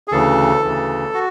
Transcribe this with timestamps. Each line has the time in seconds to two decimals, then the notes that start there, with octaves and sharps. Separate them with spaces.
0.08 G#4
0.12 D2 C#3 E3 A4
0.64 D2 C#3 E3
1.14 F#4